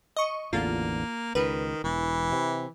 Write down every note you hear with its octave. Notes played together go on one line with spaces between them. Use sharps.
D#5 C#6
A1 E2 D3 A#3 F4
C#2 D#3 B4
E1 E3
C3